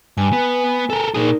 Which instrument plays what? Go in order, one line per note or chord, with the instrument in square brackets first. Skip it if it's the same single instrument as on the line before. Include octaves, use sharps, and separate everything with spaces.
[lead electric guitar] G2 [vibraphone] G#5
[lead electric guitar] B3
A4 A#4
[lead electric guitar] A#2 G#4 [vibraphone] D#4 A#4 D5